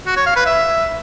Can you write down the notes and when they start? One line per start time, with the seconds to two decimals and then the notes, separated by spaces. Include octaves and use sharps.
0.06 F#4
0.16 C#5
0.26 F5
0.36 B4
0.46 E5